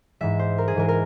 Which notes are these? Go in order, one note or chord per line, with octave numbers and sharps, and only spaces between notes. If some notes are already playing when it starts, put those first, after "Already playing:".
G#2 E3 G#3 E5
C5
A#4
G#4
G#2 E3 G#3 A#4
A#4